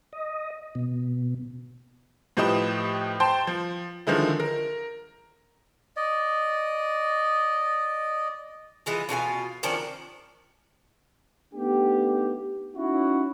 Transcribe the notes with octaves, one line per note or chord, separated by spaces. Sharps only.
D#5
B2
A2 F3 G4 B4 D#5 E7
C5 G5 A5 C6
F3
D3 D#3 F3 G#3 E4
A#4
D5 D#5
E3 G#3 F4
B2 D4 F4 G#5
D#3 F3 C#4 D4
A3 B3 D4 D#4 G4
C#4 D#4 E4 F#4